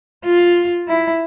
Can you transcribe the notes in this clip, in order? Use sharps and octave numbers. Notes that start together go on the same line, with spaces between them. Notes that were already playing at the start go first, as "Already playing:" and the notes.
F4
E4